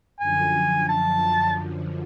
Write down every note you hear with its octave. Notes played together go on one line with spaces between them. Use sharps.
F#2 D3 F3 G#5
A5